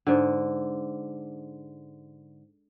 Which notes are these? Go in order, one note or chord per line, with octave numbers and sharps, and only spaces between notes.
G#2 D3